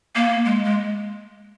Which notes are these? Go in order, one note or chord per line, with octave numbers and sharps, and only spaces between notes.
A#3
G#3
G#3